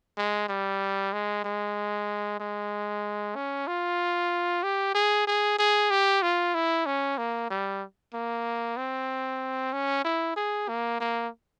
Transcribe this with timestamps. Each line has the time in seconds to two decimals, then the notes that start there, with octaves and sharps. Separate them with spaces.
0.17 G#3
0.49 G3
1.13 G#3
1.44 G#3
2.40 G#3
3.35 C#4
3.67 F4
4.63 G4
4.95 G#4
5.27 G#4
5.59 G#4
5.90 G4
6.22 F4
6.54 E4
6.86 C#4
7.18 A#3
7.50 G3
8.13 A#3
8.77 C4
9.73 C#4
10.04 E4
10.36 G#4
10.69 A#3
11.00 A#3